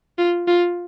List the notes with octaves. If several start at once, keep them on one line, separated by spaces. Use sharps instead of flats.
F4
F4